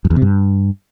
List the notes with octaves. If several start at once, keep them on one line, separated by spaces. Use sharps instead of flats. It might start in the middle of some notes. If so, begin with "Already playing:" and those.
F#2
E2
C3
G2